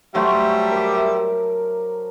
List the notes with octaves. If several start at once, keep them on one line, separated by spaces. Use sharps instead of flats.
F#3 G3 A3 C5 E5
A#4 D6